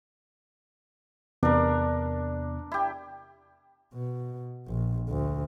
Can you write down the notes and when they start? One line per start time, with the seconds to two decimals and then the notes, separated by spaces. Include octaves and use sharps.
1.43 E2 C3 B3 D4 A#4
2.72 E4 G4
3.93 B2
4.68 A#1
5.09 D2